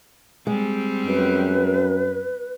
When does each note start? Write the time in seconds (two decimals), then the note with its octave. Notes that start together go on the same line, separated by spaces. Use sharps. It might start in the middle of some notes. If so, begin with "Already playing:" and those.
0.47 G3 G#3 C4
1.06 F#2 B4